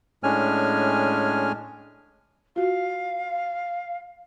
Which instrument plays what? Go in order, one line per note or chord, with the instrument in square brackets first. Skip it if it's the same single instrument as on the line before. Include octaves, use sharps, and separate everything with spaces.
[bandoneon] A2 G#3 C#4 D4 G#5 F6
[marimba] F4 F#4 [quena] F5